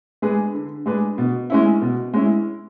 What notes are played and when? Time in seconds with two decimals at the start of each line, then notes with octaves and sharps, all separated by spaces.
0.22 G#3 D4 G#4 B4
0.54 D3
0.86 G#3 D4 G#4 B4
1.18 B2
1.50 G#3 C#4 E4
1.82 B2
2.13 G#3 C#4 E4